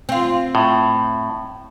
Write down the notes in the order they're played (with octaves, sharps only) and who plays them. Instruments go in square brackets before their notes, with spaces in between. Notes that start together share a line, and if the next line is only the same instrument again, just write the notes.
[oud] C4 F4
[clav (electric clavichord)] A2